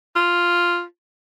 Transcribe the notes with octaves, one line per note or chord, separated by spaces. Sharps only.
F4